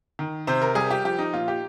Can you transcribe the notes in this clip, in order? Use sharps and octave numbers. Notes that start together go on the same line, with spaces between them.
D#3
C3 C5
A#4
G3 G#4
G4
F3 G4
D#4
A#2 F4
G4